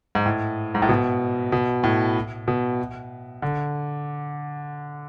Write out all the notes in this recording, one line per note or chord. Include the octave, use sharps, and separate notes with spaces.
G#2
A2
G#2
A2
B2
B2
A2
B2
D3